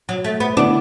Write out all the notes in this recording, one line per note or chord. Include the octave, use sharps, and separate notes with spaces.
F#3
A3
B3
D3 B3 D4 E4